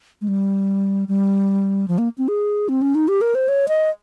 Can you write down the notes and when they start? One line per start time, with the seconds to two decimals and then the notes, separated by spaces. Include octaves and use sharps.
0.22 G#3
0.28 G3
1.08 G3
1.88 F3
1.98 A#3
2.18 C4
2.28 G#4
2.69 C4
2.82 C#4
2.95 D#4
3.08 G4
3.21 A#4
3.35 C5
3.48 C#5
3.68 D#5